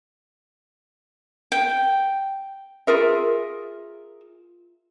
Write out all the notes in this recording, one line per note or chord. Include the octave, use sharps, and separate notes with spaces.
G5
F4 G#4 A#4 E5